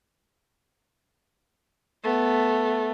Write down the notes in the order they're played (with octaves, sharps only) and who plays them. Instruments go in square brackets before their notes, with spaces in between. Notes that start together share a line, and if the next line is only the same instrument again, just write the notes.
[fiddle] A3 B3